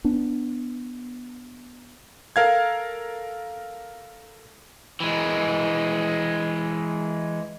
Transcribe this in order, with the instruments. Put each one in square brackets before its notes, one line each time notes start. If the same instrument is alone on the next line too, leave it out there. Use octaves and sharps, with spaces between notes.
[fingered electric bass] B3 D4
[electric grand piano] A4 A#4 F5 G#6
[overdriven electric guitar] E3 G#3